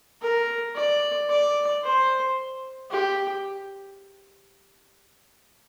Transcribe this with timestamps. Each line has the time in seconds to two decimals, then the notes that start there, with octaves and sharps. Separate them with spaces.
0.22 A#4
0.75 D5
1.30 D5
1.83 C5
2.91 G4